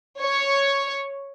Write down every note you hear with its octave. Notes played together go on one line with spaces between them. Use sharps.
C#5